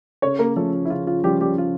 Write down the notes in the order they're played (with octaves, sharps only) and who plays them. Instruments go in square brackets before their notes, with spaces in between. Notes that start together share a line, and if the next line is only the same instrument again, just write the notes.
[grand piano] C#3 [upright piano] C#4 C#5
[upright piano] A#3 A#4
[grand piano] F3 C#4 F4 [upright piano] A3 A4
[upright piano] E4
[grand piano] C#3 [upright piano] F4
[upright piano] F4
[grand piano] F3 C#4 F4 [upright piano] G3 G4
[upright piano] G3 G4
F4